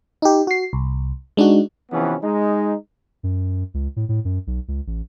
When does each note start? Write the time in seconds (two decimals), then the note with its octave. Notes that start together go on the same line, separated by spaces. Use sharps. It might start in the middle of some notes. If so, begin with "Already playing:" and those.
0.22 D#4 G4
0.47 F#4 C7
0.73 C2
1.37 G#3 D4 D#4 F#4
1.92 C3 E3 F3 B3 C#4
2.22 G#3 D#4
3.23 F#2
3.74 C#2
3.96 A2
4.09 A2
4.25 F#2
4.47 B1
4.68 C#2
4.87 A1